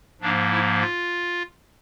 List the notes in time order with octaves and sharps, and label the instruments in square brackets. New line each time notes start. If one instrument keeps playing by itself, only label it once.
[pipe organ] G#2 F3 A#3 D4
E4
F4